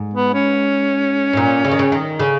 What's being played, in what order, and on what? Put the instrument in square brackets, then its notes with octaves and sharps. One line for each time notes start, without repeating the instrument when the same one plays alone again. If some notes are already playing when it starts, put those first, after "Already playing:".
Already playing: [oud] G#2
[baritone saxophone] B3
C#4
[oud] G#2
A#2
C#3
D#3
C#3
D#3
C#3